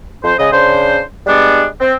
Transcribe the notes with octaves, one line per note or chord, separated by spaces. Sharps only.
F2 C5
C#3 G#3 G#4 D#5
C#3 D4 C5
G3 G#3 B3 D4
C4